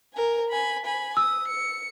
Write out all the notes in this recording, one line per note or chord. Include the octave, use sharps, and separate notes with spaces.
A#4 G#5
G#5 B5
G#5 B5
D#6 E6
C#7